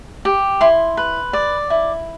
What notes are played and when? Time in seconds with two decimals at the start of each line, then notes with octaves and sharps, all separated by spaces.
0.25 G4
0.61 E4 C6
0.97 B4
1.33 D5
1.70 E4